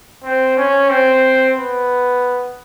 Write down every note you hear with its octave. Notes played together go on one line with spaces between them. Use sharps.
C4
C#4
C4
B3